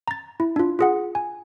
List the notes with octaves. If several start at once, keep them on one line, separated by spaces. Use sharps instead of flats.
A#5 A6
E4
D4 F4
F4 G#4 F#5
G#5